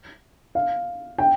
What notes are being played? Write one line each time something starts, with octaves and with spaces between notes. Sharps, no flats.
F5
G5